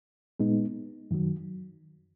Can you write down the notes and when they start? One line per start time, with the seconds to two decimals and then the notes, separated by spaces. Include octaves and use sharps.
0.39 A#2 G#3 B3 D#4
1.11 F#2 D#3 F#3